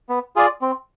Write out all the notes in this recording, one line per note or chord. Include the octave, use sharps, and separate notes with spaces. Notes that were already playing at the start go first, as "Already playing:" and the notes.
B3
F4 G#4 D5
C4